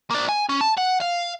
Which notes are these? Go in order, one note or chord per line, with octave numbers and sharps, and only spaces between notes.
A#3 D4
G#5
C#4
A5
F#5
F5